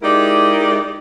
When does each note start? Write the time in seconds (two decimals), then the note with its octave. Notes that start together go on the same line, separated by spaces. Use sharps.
0.02 G#3 D#4 E4 G4 A#4 D5